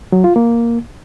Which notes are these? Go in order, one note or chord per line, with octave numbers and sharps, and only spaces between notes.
F#3
F4
A#3